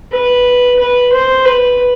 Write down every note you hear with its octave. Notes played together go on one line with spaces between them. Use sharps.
B4
B4
C5
B4